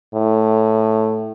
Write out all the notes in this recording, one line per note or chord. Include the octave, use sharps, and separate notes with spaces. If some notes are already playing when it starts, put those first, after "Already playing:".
A2